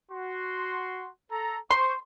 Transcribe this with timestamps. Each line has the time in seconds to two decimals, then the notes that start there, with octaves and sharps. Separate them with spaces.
0.11 F#4 C6
1.31 A4 A#5
1.71 C5 C6 C#6